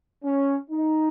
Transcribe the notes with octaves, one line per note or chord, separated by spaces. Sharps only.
C#4
D#4